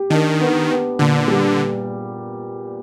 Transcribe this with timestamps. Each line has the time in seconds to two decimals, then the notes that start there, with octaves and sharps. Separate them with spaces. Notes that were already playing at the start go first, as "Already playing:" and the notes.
Already playing: G4
0.10 D#3 D4
0.40 B3
0.70 B3
0.99 A#2 D3
1.28 G3